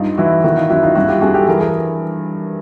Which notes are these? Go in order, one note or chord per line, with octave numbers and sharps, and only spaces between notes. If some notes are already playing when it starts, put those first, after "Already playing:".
Already playing: G2 D#4 F4
E3 E4 F#4
D#3 E4 F#4
D#4 F4
F#2 E4 F#4
D#4 F4
G2 E4 F#4
F4 G4
G2 F#4 G#4
G4 A4
E3 G#4 A#4
G#4 A#4